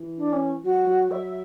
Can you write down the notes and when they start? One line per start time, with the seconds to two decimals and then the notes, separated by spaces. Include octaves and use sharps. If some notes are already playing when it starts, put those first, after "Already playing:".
Already playing: E3
0.17 D4
0.32 C#4
0.64 F#3 F#4
0.87 F#3
1.10 F#3 E5